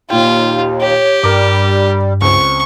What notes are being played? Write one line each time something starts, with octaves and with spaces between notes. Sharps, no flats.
D#2 A#2 F4 G5
G4 C#5
G2 G3 A#4 D6
C#2 C4 C#6